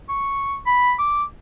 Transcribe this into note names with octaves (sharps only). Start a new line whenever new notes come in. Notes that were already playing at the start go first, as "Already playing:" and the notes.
C#6
B5
D6